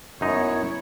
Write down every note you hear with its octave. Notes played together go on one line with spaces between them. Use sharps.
F#2 B3 D#4 E4 C#5